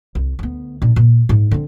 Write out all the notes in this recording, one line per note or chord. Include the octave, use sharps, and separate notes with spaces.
C2
D2 B3
A#2 D4
A#2
G#2
D3 C4